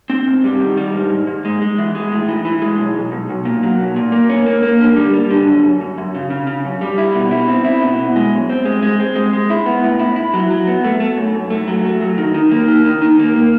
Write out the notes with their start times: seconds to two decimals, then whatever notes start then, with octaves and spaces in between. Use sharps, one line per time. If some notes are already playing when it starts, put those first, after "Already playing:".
0.10 C4
0.27 G#2
0.44 G3
0.60 D#3
0.77 G3
0.94 G#2
1.10 G#2
1.27 G#2
1.45 G#3
1.62 G#3
1.78 E3
1.95 G#3
2.12 A2
2.28 E3
2.45 E3
2.62 G#3
2.78 B1
2.95 B1
3.12 B1
3.29 B1
3.45 A#2
3.63 F#3
3.80 B1
3.96 A#2
4.12 A#3
4.29 C#4
4.46 A#3
4.62 A#3
4.79 D3
4.97 G3
5.14 G3
5.31 D3
5.47 F#2
5.63 F#2
5.81 F#2
5.98 F#2
6.15 C#3
6.30 C#3
6.47 C#3
6.65 F#2
6.81 G3
6.98 E4
7.15 B2
7.31 E4
7.48 C4
7.65 E4
7.81 B2
7.98 B2
8.16 G#3
8.33 F#2
8.49 C4
8.65 G#3
8.82 G#3
9.00 C4
9.15 G#3
9.33 G#3
9.50 E4
9.66 B3
9.84 A2
9.99 E4
10.16 E4
10.34 F#3
10.50 F#3
10.67 B3
10.84 A3
11.00 A3
11.17 F#2
11.34 F#2
11.50 A3
11.68 F#3
11.85 A3
12.01 F#3
12.18 D#3
12.34 D#3
12.52 A#3
12.68 D#3
12.85 D#3
13.02 D#3
13.19 A#3
13.36 A#3